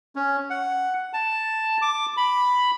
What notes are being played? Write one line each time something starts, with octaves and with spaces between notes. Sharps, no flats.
C#4
F#5
A5
D6
B5